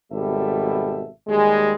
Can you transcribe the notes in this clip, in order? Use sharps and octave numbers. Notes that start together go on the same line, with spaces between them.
G#1 B2 G3 A4 E5
D#2 G3 G#3